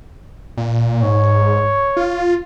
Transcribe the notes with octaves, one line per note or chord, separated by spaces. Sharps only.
A#2
G#2 C#5
F4